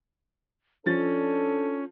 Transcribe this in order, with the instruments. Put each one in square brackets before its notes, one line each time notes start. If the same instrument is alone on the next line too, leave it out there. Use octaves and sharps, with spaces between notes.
[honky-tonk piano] F3 A6 [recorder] C#4 [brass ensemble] D4 A4